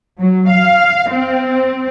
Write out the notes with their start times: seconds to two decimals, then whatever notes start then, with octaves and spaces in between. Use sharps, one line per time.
0.19 F#3
0.49 F5
1.10 C4